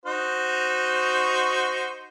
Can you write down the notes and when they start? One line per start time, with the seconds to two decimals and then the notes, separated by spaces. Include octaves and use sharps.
0.06 D#4 F#4 C5